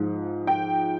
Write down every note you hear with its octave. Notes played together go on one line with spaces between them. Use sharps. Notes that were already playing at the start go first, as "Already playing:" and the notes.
Already playing: G#2 F3
G5